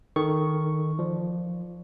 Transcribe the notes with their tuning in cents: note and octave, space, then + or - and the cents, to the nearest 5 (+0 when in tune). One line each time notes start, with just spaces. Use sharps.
D#3 +0 A4 -5 C#6 +0
F3 +0 D5 +15